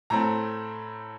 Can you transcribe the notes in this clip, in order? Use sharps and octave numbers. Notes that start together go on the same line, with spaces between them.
A2 A3 C4 A#5